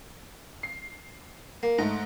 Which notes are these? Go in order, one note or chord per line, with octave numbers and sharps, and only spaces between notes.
C7
A#3
G#2 A3 D#5 A#5